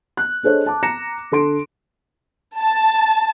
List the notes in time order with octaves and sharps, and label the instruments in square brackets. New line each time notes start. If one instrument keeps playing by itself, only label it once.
[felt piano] F#6
D4 G#4 A4 C5 C#5 D#5
A5 D6
A#5 A#6 C#7 E7
D3 A4 C6 D7
[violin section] A5